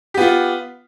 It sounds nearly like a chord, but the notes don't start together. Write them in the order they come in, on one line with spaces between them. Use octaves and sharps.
G4 B3 F4